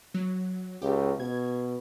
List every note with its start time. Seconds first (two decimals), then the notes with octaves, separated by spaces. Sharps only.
0.14 F#3
0.82 C#2 G4
1.20 B2 G#6